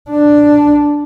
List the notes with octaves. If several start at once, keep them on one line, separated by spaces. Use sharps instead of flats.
D4